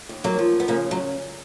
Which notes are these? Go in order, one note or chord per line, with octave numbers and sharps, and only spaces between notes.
D#2
F#3 A#3
F3
B3
C#3 A#3 C#4
F#3